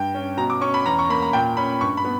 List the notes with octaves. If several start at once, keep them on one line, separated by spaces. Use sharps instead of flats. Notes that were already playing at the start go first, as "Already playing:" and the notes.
Already playing: G2 G5
C#4
B2 A#5
D6
C#4 C#6
B5
E2 A#5
C#6
A#3 B5
A#5
A#2 G5
C#4 B5
G2 C#6
B5
B3